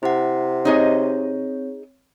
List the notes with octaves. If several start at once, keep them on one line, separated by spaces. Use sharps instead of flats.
C3 E4 F#5
C4 D#4 G#4 C#5 D#5